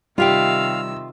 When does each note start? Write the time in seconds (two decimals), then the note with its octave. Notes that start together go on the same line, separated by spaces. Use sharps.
0.18 C3 D#3 G3 F4 E5 F5 G5 E6